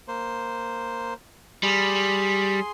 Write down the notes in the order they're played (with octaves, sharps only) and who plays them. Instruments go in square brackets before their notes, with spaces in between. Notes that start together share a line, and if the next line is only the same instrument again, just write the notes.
[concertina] A#3 C5
[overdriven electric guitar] G3 [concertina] G#4 C6